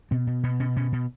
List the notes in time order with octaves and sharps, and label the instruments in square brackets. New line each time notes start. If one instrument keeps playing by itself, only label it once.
[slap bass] B2 C4
B2
B2 B3
B2 C#4
B2 C#4
B2